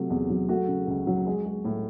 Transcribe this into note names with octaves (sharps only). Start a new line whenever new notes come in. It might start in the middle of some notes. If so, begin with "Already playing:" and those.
Already playing: C3 F#3 A3
E2
F#3
A3 F#4
C#3
C#2
F#3
G#3
G#3
A2